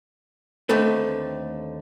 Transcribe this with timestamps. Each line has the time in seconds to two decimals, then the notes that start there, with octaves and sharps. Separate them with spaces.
0.69 D#2 D3 A3 C4 A4 B4